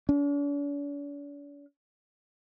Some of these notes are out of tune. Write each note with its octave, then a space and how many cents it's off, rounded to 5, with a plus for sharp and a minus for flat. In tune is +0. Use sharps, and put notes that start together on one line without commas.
D4 -45